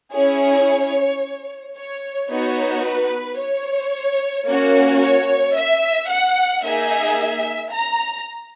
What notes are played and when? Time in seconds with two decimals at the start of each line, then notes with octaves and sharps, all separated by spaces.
0.13 C#4 E4 G#4 C#5
1.77 C#5
2.30 B3 D#4 F#4 C#5
2.84 B4
3.38 C#5
4.46 A#3 C#4 F#4
5.01 C#5
5.55 E5
6.09 F#5
6.63 A#3 D#4 G#4 E5
7.72 A#5